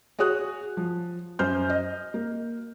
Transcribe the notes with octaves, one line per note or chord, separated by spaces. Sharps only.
F#4 G#4 C#5 D#6 F#6
F3
F#2 C5 F6 G6
D#5
A#3